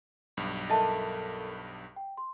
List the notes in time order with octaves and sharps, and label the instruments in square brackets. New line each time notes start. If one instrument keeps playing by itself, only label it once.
[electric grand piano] B1 G2
[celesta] A4 A#4 [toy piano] D#5 E5 A5
[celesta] G5
C6